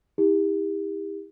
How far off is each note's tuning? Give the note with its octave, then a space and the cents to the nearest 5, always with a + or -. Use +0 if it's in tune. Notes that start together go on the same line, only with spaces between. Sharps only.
E4 -35 G4 +35